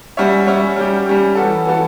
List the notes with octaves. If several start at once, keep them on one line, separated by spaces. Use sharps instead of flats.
G3 C#4 F#4 C#5 E5
G3 C#4 F#4 C#5 E5
G3 C#4 G4
G3 C#4 G4
E3 B3 F#4 A4
E3 B3 F#4 A4